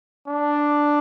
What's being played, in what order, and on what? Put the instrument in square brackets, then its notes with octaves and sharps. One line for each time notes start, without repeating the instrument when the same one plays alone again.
[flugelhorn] D4